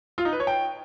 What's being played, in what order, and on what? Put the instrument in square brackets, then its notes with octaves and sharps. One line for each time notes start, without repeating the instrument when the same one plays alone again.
[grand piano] F4
D#4
B4
C#5
G5